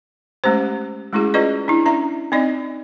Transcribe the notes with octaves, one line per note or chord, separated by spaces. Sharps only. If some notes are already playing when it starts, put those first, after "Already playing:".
G#3 A3 C#4 G4 C5
G#3 A3 C#4 E4 F#4 G#4
C#4 F4 G#4 B4 D5 D#5
D4 E4
C#4 D5 E5 A#5
C4 D#4 D5 D#5